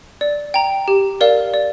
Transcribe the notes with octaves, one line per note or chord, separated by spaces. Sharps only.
D5
G5 A#5
G4
A#4 D5 F5
D5